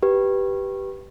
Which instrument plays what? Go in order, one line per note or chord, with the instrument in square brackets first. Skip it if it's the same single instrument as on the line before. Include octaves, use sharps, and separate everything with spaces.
[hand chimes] G4 B4